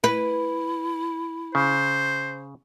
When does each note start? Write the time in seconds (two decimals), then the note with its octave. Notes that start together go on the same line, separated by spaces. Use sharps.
0.04 E4 B4
1.55 C#3 C5